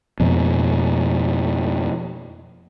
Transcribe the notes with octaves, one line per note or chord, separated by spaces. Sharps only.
F2 B2